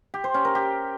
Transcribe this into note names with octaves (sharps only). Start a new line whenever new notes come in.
G4
C5
C#4
A#4
G4